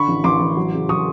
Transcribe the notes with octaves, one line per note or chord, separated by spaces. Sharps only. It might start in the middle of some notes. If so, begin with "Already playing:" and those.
Already playing: D3 B5 C#6
A1
A1 C6 D6
A1
F#3
C#3
F#3 C#6 D#6